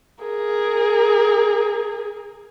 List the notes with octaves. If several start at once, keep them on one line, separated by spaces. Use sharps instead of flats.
G#4 A#4